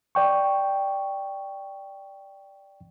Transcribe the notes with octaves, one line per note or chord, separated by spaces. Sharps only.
D5 G5 C#6